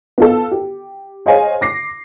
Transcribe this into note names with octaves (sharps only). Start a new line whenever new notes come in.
B3 F4 A4
G4
G#4 C5 C#5 D#5 F5 G#5
D6 A#6 C7